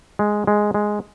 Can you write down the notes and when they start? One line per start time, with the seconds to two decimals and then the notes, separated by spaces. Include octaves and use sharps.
0.19 G#3
0.47 G#3
0.74 G#3